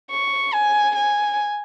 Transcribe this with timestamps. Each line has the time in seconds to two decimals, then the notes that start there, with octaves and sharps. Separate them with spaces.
0.11 C#6
0.54 G#5
0.96 G#5